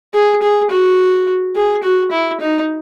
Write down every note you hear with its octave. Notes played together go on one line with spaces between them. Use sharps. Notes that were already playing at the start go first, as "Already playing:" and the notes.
G#4
G#4
F#4
G#4
F#4
E4
D#4